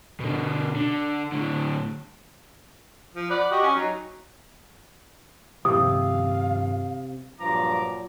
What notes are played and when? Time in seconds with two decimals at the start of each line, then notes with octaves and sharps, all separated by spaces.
0.20 B2 D3
0.76 D3
1.32 A2 D3
3.15 F3
3.30 D5 F#5 B5
3.51 F#4 G4 D#5
3.63 C#4
3.75 F#3 D#4
5.65 G2 C3 D#3 F3 F5 D#6
7.40 G2 A#2 F3 F#3 F4 A#5 D6